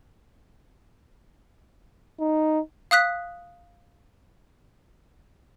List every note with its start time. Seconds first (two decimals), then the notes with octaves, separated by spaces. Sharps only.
2.20 D#4
2.91 F5 D#6 F#6 B6